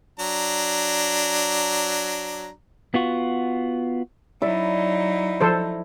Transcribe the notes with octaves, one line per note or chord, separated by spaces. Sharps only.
F#3 D4 A#5
B3 F4 F#4
F#3 D#4 E4 D5 E5
F3 A4 C5